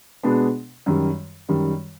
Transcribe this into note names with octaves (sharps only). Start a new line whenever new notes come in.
B2 G#3 B3 D4
F#2 D#3 G3
F#2 D#3 G3